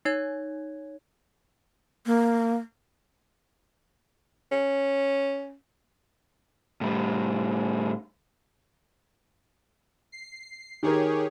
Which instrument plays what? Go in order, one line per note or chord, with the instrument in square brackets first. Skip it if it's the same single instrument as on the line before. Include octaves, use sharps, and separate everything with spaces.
[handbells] D#4 C#5 G#6
[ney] A#3
[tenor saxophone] C#4
[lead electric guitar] A2 G3
[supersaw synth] C7
[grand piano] D#3 A#4 [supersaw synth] G4 G#4 C#5